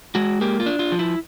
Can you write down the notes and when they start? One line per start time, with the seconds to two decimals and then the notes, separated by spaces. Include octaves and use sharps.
0.15 G#3 F#4
0.41 A#3 G4
0.60 F4
0.66 D4
0.79 F4
0.92 F3
0.99 E4